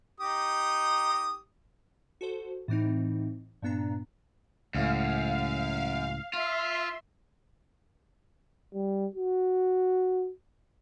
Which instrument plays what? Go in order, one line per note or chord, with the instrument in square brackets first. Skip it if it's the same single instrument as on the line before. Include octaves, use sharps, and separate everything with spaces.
[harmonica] D#4 G4 D#6
[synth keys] F#4 A4 C5
A2 E3 C4 D#4
G2 A#2 B3 D4 A#5
[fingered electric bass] C#2 A2 [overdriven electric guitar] F#2 [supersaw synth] F5
[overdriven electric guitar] F4 [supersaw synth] E5 C6
[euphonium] G3
F#4